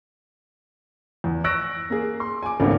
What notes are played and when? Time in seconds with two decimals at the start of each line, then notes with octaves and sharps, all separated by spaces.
1.24 E2
1.44 C#6 E6 F#6 A#6 D7
1.90 A#3 G#4
2.20 C6
2.43 G#5 D6
2.60 G#1 C#2 G2 D#3 A3 B3